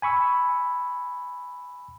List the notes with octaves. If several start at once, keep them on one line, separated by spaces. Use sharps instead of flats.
G#5 B5 C#6 E6